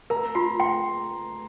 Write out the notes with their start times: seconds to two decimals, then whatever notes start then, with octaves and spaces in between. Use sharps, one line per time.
0.10 A#4 A#5
0.35 F4 C6
0.60 G5 C6